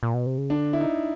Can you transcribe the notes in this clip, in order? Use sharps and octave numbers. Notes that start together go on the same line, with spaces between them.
A#2
B2
C3
C#3
D3 D4
E4
D#4